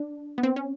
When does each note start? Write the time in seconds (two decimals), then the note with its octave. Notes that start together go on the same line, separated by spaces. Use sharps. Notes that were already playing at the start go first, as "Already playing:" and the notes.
Already playing: D4
0.38 B3
0.43 C4
0.56 C#4